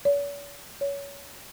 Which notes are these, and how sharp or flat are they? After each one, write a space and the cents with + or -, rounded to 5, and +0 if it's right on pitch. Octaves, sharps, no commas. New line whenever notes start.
C#5 +45
C#5 +20